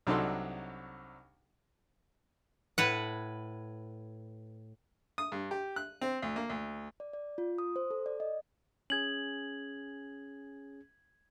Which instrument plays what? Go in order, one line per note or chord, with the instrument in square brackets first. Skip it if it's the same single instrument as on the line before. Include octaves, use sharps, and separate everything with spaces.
[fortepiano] C2 F#3 D4 D#4 A4 C6
[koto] A2 B4 F#5
[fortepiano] D#6
G2
G4
F#6
C4
D2
A#3
D2
[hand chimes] D5
D5
F4
D#6
C5
A4
D5
D#5
[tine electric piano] C#4 G#4 [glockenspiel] G#6 F#7